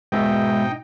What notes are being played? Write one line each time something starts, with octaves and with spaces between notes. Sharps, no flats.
G#2 B2 D#4 E5 G5